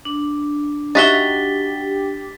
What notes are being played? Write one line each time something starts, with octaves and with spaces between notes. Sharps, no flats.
D4
D#4 F#4 G4 E5 A6 B6 G7